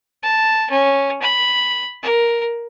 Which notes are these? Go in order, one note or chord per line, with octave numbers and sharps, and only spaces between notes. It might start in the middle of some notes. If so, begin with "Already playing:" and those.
A5
C#4
B5
A#4